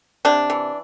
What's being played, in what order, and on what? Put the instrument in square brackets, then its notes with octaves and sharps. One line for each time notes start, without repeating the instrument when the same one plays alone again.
[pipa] C3 D4
E3